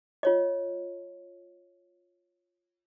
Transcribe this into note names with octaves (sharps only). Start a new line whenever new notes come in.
F4 C#5 D#5